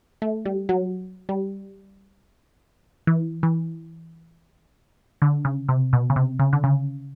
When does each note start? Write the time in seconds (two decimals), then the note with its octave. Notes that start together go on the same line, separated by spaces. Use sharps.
0.22 A3
0.45 G3
0.69 F#3
1.29 G3
3.07 E3
3.43 E3
5.22 D3
5.45 C#3
5.69 C3
5.93 B2
6.10 C#3
6.16 C3
6.39 C#3
6.53 D3
6.64 C#3